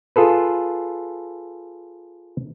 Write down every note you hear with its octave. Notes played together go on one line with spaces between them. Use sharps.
F4 G#4 A4 B4